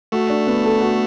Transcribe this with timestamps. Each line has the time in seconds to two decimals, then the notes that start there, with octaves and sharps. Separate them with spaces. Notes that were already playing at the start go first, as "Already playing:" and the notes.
0.12 A3 F#4
0.30 D4
0.47 B3
0.64 A4
0.81 F#4